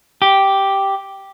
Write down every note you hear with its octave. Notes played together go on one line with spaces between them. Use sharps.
G4